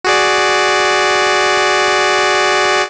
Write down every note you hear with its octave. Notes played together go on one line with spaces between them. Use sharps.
F#4 G#4 D5